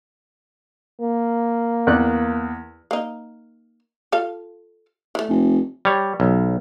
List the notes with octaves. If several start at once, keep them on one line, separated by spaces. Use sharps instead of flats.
A#3
E2 D5 F#6
A#3 D#4
F4 A4 F5
E3 A3
F1
G3 C#5
B1